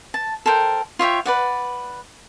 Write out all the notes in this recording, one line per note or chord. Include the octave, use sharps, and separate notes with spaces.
A5
A4 A#4 C5 G5
F4 C#5 E5 G5
B4 D5 F#5